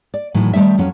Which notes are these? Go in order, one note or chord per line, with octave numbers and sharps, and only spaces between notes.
D5
A2 D#3 E3 F#3
D#3 G3 A3 D#4 E5
F2 F#3 C#4